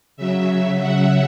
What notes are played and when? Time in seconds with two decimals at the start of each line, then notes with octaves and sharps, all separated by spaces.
0.17 C#3 F#3 E5
0.81 F#5